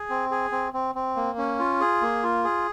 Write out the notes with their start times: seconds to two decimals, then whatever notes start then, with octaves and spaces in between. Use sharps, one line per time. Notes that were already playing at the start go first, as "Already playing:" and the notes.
Already playing: G#4
0.10 C4
0.31 G#4
0.52 C4
0.74 C4
0.95 C4
1.16 A#3
1.38 C#4
1.59 F4
1.80 G#4
2.02 A#3
2.23 F4
2.44 G#4